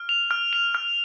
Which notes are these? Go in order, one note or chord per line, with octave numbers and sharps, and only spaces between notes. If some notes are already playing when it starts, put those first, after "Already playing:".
Already playing: F6
F7
F6
F7
F6